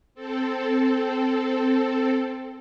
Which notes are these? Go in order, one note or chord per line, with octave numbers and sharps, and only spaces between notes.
C4 A4